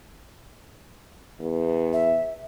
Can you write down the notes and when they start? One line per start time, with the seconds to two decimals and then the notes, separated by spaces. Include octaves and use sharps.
1.40 E2
1.93 E5